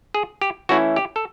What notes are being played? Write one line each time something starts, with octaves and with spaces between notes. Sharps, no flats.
G#4
G4
E3 A3 C#4 E4 F#4
G4
A4